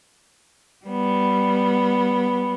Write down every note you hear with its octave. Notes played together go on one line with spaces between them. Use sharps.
G3 B3